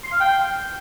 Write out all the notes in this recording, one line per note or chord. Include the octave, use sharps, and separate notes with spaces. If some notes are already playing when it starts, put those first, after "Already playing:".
C6
F5
G5